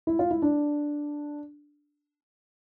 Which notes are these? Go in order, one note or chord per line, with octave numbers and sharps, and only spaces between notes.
E4
F4
E4
D4